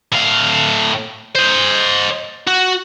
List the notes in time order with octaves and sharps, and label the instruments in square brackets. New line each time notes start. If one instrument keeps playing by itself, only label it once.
[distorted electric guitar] A2 F5
C5 D#5
F#4